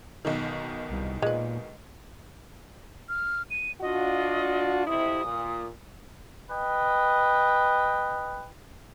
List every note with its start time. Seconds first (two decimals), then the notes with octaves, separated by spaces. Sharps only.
0.25 B1 B2 D#3
0.90 C2
1.22 A#2 G#3 B4
3.09 F6
3.50 D#7
3.82 D4 F4 F#4 D#5
4.87 F2 C3 E4 D#6
5.25 A#2
6.51 B4 D#5 G5